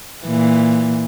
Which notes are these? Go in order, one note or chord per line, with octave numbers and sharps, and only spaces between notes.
A#2 E3